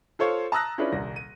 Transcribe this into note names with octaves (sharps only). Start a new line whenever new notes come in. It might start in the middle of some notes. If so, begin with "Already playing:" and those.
F4 A4 C5 C#5 F5
A5 A#5 D#6 E6 F#6 A#6
C#4 D4 E4 F4 G#4 B4
D#1 C2 A#6
D#7